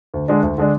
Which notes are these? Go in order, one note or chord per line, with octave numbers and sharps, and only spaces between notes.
D2
D3 G#3 D4
D2
D3 G#3 D4